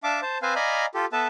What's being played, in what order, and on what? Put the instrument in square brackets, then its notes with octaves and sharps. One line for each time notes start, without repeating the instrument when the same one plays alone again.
[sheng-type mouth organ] D4 E5 F5 A5 D6
C5 A5
C4 B4 C5 F5 G#5
D5 D#5 F5 G#5 A#5 B5
F4 G4 A4
B3 A4 B4 E5 A5